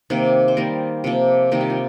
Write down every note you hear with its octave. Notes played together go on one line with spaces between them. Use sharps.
C3 D#3 A#3
C5
D#3 G3 A#3 A#4
C3 F3 A#3
C3 D#3 G3 A#3 A#4
G4
F4